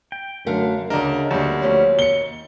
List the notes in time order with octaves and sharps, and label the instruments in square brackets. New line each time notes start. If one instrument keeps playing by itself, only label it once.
[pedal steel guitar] G5
[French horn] F#2 [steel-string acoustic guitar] D3 A#4 F5 [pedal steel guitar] A3
[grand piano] D2 A#4 [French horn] C#3 [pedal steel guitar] D4 [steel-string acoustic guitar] D5 D#5
[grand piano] D2 G3 [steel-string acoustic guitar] D3 F#3 [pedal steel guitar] A#3 F#4 A5
[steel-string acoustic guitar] F3 A3 C#4 [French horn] C#5
[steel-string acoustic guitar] D#2 [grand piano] C#7 G7